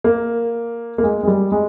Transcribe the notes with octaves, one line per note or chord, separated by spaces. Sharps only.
A#3
A#3
G#3
G#3
G3
G#3